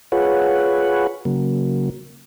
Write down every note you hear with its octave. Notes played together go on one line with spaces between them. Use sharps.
F4 G#4 B4 C#5 F#5
C#3 F#3 A#3